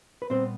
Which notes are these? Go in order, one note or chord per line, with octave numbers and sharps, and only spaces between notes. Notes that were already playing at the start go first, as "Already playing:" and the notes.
B4
A#2 G3 B3 C4 C5